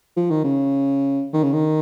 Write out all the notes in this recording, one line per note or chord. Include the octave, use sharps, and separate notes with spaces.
F3
D#3
C#3
D#3
C#3
D#3